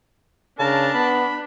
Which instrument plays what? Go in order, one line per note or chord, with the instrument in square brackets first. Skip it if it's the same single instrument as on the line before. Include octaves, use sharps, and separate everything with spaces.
[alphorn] C#3 [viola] D4 [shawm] A#4 [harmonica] A5
[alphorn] B3 [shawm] B5